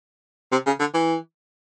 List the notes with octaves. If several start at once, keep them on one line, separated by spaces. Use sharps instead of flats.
C3
C#3
D3
E3